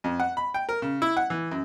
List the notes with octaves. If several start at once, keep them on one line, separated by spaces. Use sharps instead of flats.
F2
F#5
B5
G5
A#4
C#3
E4
F#5
E3
F#2